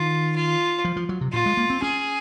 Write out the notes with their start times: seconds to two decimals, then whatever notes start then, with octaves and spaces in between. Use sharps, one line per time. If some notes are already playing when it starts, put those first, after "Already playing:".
Already playing: D#3 F4
0.35 F4
0.85 F3
0.96 F3
1.09 F#3
1.21 C3
1.33 A#2 F4
1.46 G#3
1.57 A#3
1.70 C4
1.82 C#4 G#4